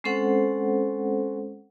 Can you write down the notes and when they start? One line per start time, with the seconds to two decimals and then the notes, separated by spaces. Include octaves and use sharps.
0.04 G#3 C4 C#4 A4 C5 F#5